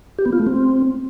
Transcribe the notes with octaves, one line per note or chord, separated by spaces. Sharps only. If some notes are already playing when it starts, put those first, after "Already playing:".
G4
B3
F4
A3
C4